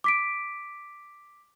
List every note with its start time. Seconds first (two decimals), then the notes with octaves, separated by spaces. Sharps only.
0.04 D6 B6 D7